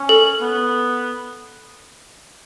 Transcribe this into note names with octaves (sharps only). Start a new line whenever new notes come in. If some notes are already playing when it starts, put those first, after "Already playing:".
Already playing: C#4
A4
B3